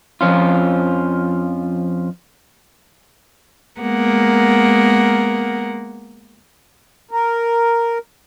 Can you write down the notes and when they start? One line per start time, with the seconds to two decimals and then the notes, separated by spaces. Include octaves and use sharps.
0.21 F2 F3 C#4 F4
3.80 G#3 A#3 B3 A#4 F#5
7.11 A#4